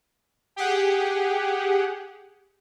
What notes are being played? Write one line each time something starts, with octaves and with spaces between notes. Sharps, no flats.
G4 G#4 F#5